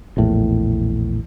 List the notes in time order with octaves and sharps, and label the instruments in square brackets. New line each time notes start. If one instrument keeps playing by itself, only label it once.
[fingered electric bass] A#1 E2 A2